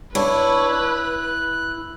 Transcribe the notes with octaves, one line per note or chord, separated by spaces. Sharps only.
D4 E4 B4 C#5
F#6